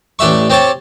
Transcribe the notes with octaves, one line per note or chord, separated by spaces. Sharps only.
A1 D4 G4 E5 C#6
C4 G4 C#5 A5